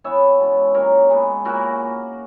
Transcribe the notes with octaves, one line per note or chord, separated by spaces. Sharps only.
E3 B3 E4 C#5 E5
B2 G#3 C#4
A#2 F#3 A#3 D#4 A#4 C#5
C#3 G#3 B3 E4
A#2 A#3 E4 F#4 A#4